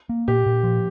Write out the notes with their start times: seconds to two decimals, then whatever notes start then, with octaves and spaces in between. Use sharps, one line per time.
0.09 A#3
0.28 A#2 G4
0.46 A#2
0.64 F3